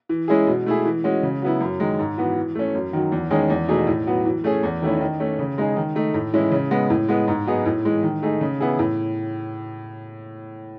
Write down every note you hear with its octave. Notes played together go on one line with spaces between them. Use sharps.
E3
G#3 C#4 E4 G#4
B2
A3 E4 G#4
E3
G#3 C#4 F#4
C#3
F#3 B3 E4
F#2
D#3 G#3
G#2
E3 B3 F#4
E3
A3 C#4
F#2
D#3 F#3
E2
D#3 G#3 C#4 G#4
E2
B2 A3 D#4 G#4
A2
F#3 B3 F#4
E3
A3 C#4 G#4
E2
D#3 A3 C#4 E4
D#3
A3 C#4
C#3
G#3 D#4 G#4
D#3
A3 D#4
A2
E3 G#3 C#4 E4
C#3
G#3 B3
A2
G#3 B3
G#2
F#3 B3 D#4 G#4
A2
E3 G#3
D#3
A3 D#4 G#4
C#3
E3 B3 E4 G#4
A2